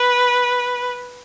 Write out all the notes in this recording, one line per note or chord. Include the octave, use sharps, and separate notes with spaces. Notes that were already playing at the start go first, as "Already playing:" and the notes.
Already playing: B4